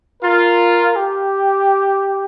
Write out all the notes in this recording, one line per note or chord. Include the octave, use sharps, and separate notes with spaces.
F4 A#4
G4